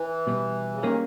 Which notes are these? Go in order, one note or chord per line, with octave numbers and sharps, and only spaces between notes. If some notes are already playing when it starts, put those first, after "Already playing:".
Already playing: E3
B2 G3 B3
C#3
D#3 G3 A#3 C#4 G#4